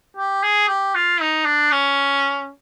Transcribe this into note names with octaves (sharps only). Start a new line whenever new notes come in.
G4
G#4
G4
F4
D#4
D4
C#4